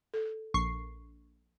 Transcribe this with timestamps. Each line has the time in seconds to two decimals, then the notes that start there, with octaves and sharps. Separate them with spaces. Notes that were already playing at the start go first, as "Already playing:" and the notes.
0.14 A4
0.54 A#1 C#6 C7